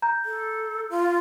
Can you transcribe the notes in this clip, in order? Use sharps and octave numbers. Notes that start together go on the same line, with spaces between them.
A#5 G6
A4
F4